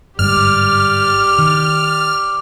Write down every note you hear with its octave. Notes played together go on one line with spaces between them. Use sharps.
G1 G#2 G3 G4 D5 F6
D#3